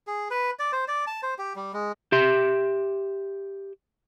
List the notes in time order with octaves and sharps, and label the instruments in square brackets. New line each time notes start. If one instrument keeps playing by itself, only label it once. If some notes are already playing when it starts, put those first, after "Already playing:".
[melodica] G#4
B4
D5
C5
D5
A5
C5
G4
G3
G#3
[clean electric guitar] G4 E5 C6